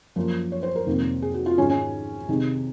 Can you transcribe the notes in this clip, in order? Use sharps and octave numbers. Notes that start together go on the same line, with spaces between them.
F#2 F3 A#3
C#5
C5
A#4
F2 C3 D#3 A#3
G#4
F#4
F4
G#2 D#3 G#3 C#4
C#4
C3 D#3 G#3